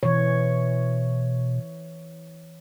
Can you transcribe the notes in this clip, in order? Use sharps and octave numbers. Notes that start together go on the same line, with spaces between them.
B2 E3 C#5